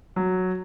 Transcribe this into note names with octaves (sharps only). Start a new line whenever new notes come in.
F#3